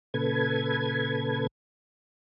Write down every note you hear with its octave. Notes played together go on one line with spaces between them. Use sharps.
A#2 C#3 A4 B4 G#6